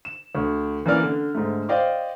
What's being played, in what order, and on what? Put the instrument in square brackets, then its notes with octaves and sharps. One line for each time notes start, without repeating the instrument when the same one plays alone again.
[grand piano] E7
D2
E3 A#3 B3 C#4 D5 F6
D3
G#2 D3 A3
C5 D5 D#5 F5 G5 D6